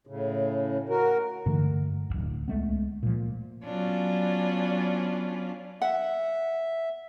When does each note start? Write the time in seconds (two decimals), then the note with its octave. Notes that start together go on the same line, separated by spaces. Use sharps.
0.07 A2 C#3
0.89 F#4 A#4
1.46 G2 D3 E3 A3
2.10 D1 C2
2.48 C#2 G#3 A3 B3
3.03 A#2 F3
3.64 F#3 B3 C#4 D4 F4
5.82 E5 F#5